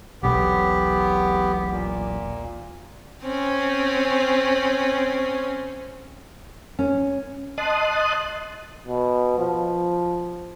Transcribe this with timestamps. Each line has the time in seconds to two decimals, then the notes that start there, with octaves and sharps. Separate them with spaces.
0.23 E1 B1 B3 G4
1.72 A#2
3.23 C4 C#4
6.79 C#4
7.58 D#5 A5 C6 D#6 F#6
8.86 B2
9.38 F3